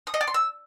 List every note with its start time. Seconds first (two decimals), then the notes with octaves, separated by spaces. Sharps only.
0.07 D#6
0.14 D#5
0.21 D5
0.27 C6
0.34 E6